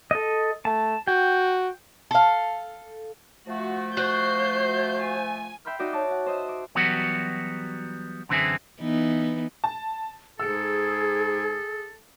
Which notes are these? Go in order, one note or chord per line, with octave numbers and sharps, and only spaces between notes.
A4 D#5
A3 A5
F#4 G5
A4 F5
F3 A3 F#4
F#4 C5 G6 C7
G#5
E5 G5 B5 C6 F6
D#4 F#4 D5 E5
C#5 A5 D6
F#5
C5 D#5 E5
D6
E3 F#3 G3 B3 F#4
F#2 D3 E3 C4 E4 G#4
E3 B3 D#4
A5
G#2 G#4 A4 E6 C#7